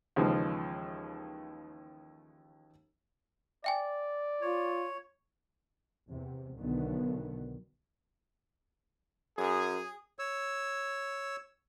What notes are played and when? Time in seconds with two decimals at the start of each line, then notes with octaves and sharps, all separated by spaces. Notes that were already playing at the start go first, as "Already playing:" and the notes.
0.16 D#2 C#3 E3 F3 G#3
3.64 D5 E5 G5 G#5
4.42 F4 C#5
6.08 E2 C3
6.58 B1 D3 D#3 F#3 B3
9.38 F#2 G#4
10.19 C#5 E6